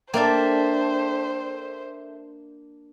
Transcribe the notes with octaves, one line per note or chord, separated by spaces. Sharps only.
A#3 D4 A4 C5 E5 G5